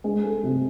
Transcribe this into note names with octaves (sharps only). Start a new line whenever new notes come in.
G#3
A4
C3